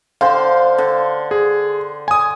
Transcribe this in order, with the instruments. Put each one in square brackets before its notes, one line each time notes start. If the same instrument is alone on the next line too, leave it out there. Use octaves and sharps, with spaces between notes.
[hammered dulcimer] D3 C5 G5 [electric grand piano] F5
[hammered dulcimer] D3
[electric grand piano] G#4
G#5 D#6